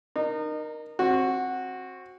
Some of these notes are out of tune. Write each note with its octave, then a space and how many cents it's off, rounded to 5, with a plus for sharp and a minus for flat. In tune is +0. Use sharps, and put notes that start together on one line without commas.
D#4 -30 A#4 +10
C4 +25 F#4 -5